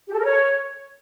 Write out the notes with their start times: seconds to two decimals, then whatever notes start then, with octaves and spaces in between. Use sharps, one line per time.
0.08 G4
0.13 A4
0.19 A#4
0.24 C#5